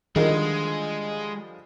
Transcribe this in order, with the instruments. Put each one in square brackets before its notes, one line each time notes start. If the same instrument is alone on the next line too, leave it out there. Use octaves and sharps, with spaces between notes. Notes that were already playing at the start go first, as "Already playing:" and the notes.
[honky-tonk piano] D3 F3 G3 [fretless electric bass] D#3 [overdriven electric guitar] G#3 [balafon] G#4 A#4 D#5